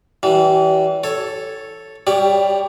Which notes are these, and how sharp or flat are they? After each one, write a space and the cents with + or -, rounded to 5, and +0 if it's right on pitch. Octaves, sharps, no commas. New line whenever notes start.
E3 -10 G3 -40
A4 +0 C#5 +0
G3 +0 G4 +25 C#5 +25